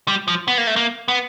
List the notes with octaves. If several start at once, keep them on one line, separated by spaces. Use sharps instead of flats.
G3
F3
B3
A#3
A3
A#3
B3